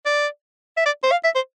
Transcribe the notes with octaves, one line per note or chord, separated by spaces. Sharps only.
D5
E5
D5
C5
F5
E5
C5